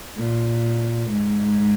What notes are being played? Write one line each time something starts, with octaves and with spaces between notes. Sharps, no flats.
A#2
G#2